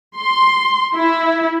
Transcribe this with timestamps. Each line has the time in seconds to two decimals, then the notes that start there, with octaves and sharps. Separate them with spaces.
0.16 C6
0.94 E4